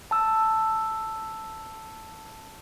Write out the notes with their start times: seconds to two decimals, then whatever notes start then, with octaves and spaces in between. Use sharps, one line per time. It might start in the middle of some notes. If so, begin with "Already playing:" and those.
0.11 A5 E6